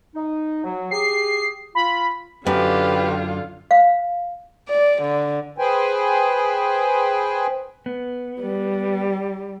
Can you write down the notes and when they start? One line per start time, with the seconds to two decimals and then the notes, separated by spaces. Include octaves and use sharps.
0.15 D#4
0.64 F#3
0.91 G4 G#4 C7
1.75 F4 B5
2.47 F#2 D3 F4 G4 B4
3.71 F5
4.69 D5
5.02 D3
5.58 G#4 B4 C5 G5 G#5
7.86 B3
8.41 G3